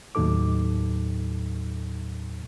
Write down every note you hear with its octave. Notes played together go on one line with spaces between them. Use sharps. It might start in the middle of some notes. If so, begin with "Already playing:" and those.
D#2 A2 F#3 D#4 A4 D6